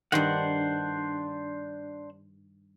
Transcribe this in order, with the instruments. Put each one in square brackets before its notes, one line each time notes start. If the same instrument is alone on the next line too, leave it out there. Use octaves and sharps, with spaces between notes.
[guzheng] G2 D#3 [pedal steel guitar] D4 C5 F#5